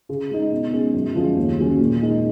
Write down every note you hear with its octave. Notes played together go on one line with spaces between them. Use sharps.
C#3
G#3 D#4
B2
G#3 C#4
F#2
F3 G#3 C#4
D#2
C#3 F#3 C#4
A#2
G#3 D#4